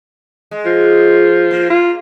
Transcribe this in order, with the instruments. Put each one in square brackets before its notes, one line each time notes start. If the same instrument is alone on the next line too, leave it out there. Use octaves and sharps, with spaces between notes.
[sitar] G#3
[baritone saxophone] F3
[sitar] A#3
[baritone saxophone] F4